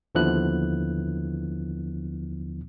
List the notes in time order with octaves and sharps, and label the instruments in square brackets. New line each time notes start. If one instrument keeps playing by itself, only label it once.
[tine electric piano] D#2 D3 F3 B3 E4 F#6